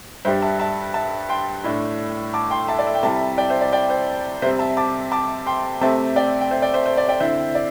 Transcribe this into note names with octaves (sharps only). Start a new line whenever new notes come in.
G2 G3 D4 C5 E5
E5 A5
E5 A5
E5 A5
G5 C6
A2 A3 D4
A5 D6
G5 C6
E5 A5
D5
E5
G5
C3 G3 E4 E5 A5
D5 G5
C5 E5
D5
D5 G5
C5
C3 G3 C4 C5 E5
E5 A5
A5 D6
A5 D6
G5 C6
C3 A3 C4 E5 A5
D5 G5
G5
C5 E5
D5 G5
C5 E5
C5
D5
D5 G5
D3 C4 E4 C5 E5
D5